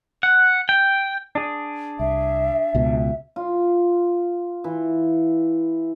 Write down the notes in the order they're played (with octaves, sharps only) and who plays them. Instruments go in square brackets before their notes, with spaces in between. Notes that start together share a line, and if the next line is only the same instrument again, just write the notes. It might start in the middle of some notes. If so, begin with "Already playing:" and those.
[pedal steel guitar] F#5
G5
D4 G#4
[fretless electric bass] C2 [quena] E5
[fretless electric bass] C#2 B2
[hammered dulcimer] F4
E3